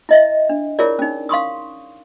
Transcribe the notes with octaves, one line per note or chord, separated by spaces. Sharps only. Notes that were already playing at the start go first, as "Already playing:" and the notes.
E4 D#5 E5
D4
E4 F4 G#4 A#4 C#5 D5
C#4 D#4
F5 C6 C#6 D#6